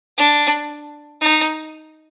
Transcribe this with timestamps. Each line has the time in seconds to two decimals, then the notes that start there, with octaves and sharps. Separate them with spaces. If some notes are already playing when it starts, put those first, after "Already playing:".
0.17 D4
1.21 D#4